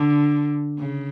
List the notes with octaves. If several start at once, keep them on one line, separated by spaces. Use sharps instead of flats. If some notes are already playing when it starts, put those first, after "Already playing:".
Already playing: D3
C#3